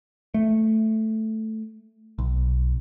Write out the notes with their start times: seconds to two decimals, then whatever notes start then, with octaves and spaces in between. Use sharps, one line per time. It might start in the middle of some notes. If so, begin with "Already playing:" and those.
0.34 A3
2.19 B1